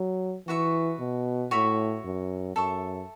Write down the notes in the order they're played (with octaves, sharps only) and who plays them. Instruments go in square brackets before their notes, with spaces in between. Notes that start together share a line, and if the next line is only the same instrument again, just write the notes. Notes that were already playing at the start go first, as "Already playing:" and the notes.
Already playing: [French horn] F#3
[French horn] E3 [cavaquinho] F#4 B4 E5 C#6
[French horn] B2
[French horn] A2 [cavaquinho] F#4 C#5 E5 B5
[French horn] F#2
[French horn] F#2 [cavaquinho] A4 E5 C#6